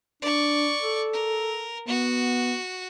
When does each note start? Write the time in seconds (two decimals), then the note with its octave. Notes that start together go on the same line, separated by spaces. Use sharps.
0.22 D4 D5 C#6
0.82 A4
1.13 A#4
1.88 B3 F#4